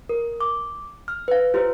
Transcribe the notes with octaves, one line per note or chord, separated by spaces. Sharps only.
A#4
D6
F6
B4 F5
F4 G4 B4 C5